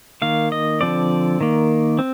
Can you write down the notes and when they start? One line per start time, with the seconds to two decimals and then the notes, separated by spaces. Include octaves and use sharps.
0.22 D#3 A#3 F5
0.52 D#5
0.81 D3 F3 C4 D5
1.41 D#3 A#3
1.99 C4